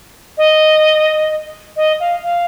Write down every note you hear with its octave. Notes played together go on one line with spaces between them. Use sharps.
D#5
D#5
F5
F5